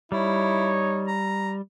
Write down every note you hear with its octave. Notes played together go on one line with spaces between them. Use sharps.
G3 D#4 E4 C#5
A#5